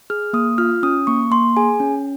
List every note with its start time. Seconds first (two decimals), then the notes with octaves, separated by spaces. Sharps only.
0.10 G#4 F6
0.33 A#3 D#6
0.58 F4 F6
0.83 C#4 D#6
1.07 A#3 C#6
1.31 A#3 C6
1.57 G#4 G#5
1.80 C#4